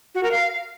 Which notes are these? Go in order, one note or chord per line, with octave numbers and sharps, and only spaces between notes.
F#4
A#4
F5